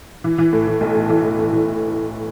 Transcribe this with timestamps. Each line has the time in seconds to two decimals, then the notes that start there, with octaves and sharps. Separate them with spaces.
0.24 E3
0.38 E3
0.52 A2
0.67 E3
0.81 B1
0.95 A2
1.10 E3
1.24 A2
1.39 A2
1.53 E3